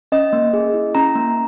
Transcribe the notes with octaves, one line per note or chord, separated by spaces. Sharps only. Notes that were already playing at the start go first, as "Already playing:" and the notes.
C#4 D#5
A#3
G#4
E4
C#4 A#5
A#3